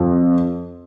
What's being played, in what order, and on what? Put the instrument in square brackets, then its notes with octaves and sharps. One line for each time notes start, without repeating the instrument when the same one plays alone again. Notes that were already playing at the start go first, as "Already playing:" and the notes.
Already playing: [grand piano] F2